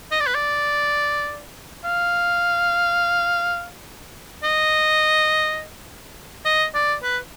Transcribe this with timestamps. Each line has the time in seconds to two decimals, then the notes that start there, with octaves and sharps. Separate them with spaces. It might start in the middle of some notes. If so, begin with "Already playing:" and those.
0.11 D#5
0.20 D5
0.26 B4
0.35 D5
1.84 F5
4.44 D#5
6.45 D#5
6.75 D5
7.03 B4